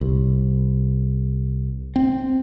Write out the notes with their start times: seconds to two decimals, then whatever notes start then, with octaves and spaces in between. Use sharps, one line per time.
0.01 C2
1.96 C4